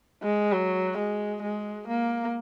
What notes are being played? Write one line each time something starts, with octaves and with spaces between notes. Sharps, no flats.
G#3
F#3
G#3
G#3
A#3